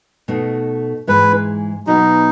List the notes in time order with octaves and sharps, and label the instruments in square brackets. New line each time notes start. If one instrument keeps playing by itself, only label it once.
[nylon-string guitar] B2 A3 D#4
[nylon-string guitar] G#2 E3 G#3 [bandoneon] B4
[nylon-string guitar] B2 F#3 B3 [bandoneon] D#4